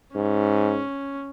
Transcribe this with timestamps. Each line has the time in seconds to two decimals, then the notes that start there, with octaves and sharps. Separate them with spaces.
0.15 G#2 C#4